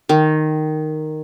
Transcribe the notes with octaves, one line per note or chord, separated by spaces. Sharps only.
D#3